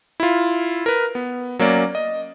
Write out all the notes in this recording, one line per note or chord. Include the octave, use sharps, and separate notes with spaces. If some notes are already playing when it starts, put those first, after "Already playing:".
E4 F4
A#4 B4
B3
F#3 A#3 C#4 D5
D#5